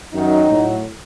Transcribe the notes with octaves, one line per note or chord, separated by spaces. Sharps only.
F#2 D#3 F#3 D#4
A2 F#3